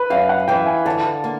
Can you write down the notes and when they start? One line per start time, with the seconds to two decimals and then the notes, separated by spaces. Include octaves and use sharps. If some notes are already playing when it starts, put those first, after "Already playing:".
Already playing: B4
0.10 F#2 F5
0.29 F#5
0.48 E3 G5
0.67 G#5
0.85 D3 A5
1.24 A#3